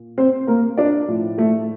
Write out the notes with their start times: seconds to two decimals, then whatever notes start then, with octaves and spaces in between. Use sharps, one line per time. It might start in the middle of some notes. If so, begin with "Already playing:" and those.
Already playing: A#2
0.18 C4 C5
0.47 A#3 A#4
0.77 D4 D5
1.08 A2 F3
1.38 A3 A4